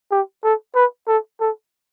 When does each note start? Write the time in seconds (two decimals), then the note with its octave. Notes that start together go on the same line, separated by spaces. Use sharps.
0.11 G4
0.44 A4
0.75 B4
1.07 A4
1.40 A4